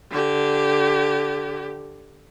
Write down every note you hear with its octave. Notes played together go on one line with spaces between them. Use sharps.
D3 G4